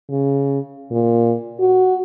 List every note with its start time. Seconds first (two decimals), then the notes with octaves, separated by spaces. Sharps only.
0.10 C#3
0.91 A#2
1.60 F#4